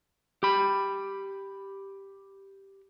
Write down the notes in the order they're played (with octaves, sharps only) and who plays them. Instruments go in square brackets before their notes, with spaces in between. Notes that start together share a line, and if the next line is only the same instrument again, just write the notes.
[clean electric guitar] G4 B5